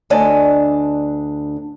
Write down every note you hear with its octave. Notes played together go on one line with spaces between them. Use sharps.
D2 D4 D5 D#5 G#5